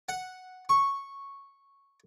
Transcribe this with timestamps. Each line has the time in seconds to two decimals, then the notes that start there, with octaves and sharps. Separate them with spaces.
0.09 F#5
0.69 C#6